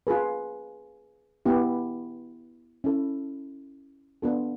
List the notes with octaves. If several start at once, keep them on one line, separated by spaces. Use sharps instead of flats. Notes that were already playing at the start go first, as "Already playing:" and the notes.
F4 G#4 B4
B3 E4 G4
C#4 E4 A4
B3 D4 F4 A4